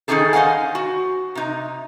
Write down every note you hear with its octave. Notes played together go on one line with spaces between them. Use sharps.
D#3 F3 C#4 D#4 G#4 A4
C5 D#5 F5 F#5 G#5
F#4
C3 D#4